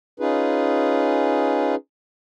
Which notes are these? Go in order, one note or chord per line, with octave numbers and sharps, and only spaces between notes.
C#4 D#4 F4 G#4 B4